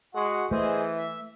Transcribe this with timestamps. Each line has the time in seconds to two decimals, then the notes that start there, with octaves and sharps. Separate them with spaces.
0.15 G#3 F#4 F#5
0.51 E3 A3 G#4 C5 D#5
0.97 E5